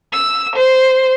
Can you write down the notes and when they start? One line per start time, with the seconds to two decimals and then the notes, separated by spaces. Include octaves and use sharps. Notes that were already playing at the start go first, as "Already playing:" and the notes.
0.12 E6
0.55 C5